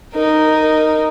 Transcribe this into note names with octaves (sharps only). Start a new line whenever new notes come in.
D#4 A#4